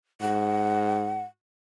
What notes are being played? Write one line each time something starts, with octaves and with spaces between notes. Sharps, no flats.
G#2 F#5